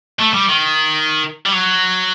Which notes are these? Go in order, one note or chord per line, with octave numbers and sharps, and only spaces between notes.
A3
G3
D#3
G3
F#3